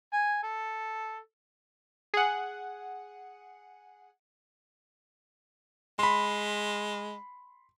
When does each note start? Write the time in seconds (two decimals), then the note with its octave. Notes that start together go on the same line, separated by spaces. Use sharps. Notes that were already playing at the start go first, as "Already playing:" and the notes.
0.13 G#5
0.43 A4
2.14 G#4 F#5
5.99 G#3 B5 C6